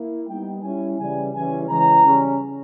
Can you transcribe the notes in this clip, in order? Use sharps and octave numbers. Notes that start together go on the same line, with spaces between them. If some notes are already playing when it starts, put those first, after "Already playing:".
Already playing: A#3 E4
G3 B3 D#4 G5
G3 C#4 E4 G#5
C#3 E3 G3 G#5
C#3 E3 G3 C#4 E4 G#5
C#3 E3 G#3 C#4 A#5
C#3 G3 C#4